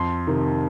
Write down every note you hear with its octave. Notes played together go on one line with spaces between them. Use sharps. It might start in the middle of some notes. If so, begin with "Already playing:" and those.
Already playing: F2 C6
C3 D#3